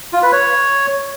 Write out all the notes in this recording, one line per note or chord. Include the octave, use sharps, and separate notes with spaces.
F4
B4
C#5